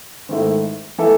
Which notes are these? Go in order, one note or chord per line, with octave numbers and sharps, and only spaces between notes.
G#2 D#3 A3 E4
E3 A3 E4 A4